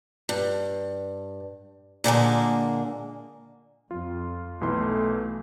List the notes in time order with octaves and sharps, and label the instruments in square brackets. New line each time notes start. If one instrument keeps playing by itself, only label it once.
[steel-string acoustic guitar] G2
A#2 D3 G#3 A#3
[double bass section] F2 [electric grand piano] F4
[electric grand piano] B1 E3 C6 [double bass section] A3